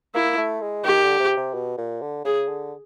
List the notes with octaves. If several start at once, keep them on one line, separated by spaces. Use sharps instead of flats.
A#3 E4
A3
G#3
D#3 G4
D3
C3
C3
B2
A#2
D3
C#3 G#4
D3